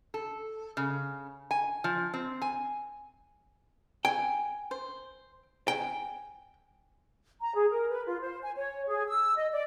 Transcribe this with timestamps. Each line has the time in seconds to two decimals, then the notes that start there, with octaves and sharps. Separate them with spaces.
0.14 A4
0.77 C#3
1.51 G#5
1.84 F3
2.14 C4
2.42 G#5
4.05 G5 G#5
4.71 C5
5.68 G5 G#5
7.41 A#5
7.54 G#4
7.69 A#4
7.89 B4
8.06 F4
8.20 C5
8.42 G#5
8.55 C#5
8.87 G#4
9.07 E6
9.36 D#5
9.51 D5